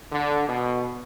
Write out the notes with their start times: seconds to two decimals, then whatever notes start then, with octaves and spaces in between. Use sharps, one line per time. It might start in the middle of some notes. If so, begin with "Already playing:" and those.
0.12 D3
0.49 B2